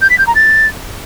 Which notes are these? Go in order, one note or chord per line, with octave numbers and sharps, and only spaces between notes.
G6
B6
G6
A#5
A6